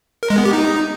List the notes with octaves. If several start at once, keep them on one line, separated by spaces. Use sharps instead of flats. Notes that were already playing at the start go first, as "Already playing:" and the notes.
A#4
G#3
B3
G4
D#4